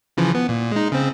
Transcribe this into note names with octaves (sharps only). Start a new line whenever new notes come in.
C#3 E3 F3
B3
A#2
G#3 D#4
C#3 C4